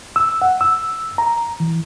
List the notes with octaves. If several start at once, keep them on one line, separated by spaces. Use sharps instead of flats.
E6
F#5
E6
A#5
E3